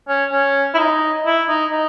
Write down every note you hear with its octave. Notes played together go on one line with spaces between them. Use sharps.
C#4
C#4
E4
D#4
E4
D#4
D#4